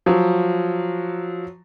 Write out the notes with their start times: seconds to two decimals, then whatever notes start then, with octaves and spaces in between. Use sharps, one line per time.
0.06 F3 F#3